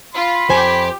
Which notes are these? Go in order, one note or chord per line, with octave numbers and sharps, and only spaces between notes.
F4 B5
F2 G4 C5 G#5